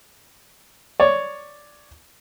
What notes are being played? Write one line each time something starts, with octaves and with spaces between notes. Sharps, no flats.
C#5 D5